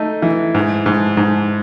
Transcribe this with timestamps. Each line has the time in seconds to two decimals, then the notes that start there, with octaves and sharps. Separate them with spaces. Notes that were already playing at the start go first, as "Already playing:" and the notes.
Already playing: A3 D#4
0.22 E3
0.54 G#2
0.86 G#2
1.17 G#2